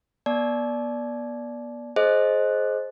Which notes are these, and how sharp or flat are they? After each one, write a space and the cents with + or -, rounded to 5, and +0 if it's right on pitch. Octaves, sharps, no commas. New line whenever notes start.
B3 -35 D5 +0 A5 -40
G#4 +30 C5 +15 D#5 +0